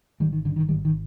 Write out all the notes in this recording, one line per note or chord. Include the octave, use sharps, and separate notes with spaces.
G#1 D#3 G3
D#3
G2 D3
D#3
G#1 D#3 G3
D#3